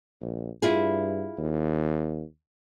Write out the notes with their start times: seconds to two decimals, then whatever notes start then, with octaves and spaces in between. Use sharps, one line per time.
0.21 A#1
0.62 G2 E4 F4 G#4
1.38 D#2